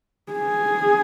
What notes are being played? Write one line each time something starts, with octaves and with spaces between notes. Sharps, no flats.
G#4